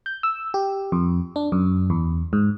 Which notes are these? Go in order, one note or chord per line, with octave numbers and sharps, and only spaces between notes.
G6
E6
G4
F2
D4
F#2
E2
G#2